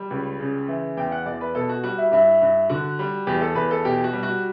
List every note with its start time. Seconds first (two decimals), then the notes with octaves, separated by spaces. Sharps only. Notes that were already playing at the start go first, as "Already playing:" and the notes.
Already playing: G3
0.10 C#2
0.40 C#3
0.68 E3
0.97 E2 G5
1.12 F#5
1.26 E2 D5
1.41 B4
1.55 B2 A4
1.69 F#4
1.84 G3 F#4
1.98 E4
2.12 G2 E4
2.42 G2
2.70 D3 F#4
2.99 G3
3.27 E2 G4
3.41 A4
3.55 E2 B4
3.71 A4
3.85 B2 G4
4.04 F#4
4.13 G3
4.23 F#4